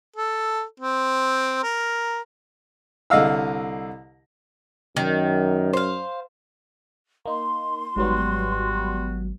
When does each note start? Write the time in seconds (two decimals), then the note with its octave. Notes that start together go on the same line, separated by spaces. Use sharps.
0.16 A4
0.80 C4
1.63 A#4
3.10 C2 D3 D#5 F5 E6
4.97 F#2 D#3
5.73 C5 F5
7.26 A#3 D#4 C6
7.96 G#1 G#2 F#3 G3 B3 F#4